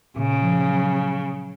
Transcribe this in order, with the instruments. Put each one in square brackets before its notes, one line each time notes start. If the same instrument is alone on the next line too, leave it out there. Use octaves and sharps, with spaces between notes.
[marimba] A#2 [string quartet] C#3
[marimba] F3
F#3